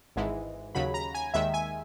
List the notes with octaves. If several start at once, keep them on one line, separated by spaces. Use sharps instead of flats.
G#1 G#2 E3 G#3
D#2 C#3 F#3 B5
A#5
G#5
D#2 D#3 G#3 E5
G#5